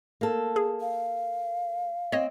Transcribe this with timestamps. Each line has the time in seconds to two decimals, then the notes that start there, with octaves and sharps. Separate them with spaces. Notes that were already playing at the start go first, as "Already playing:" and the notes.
0.21 A#3 A4
0.56 G#4
0.81 F5
2.12 C4 C#5 D#5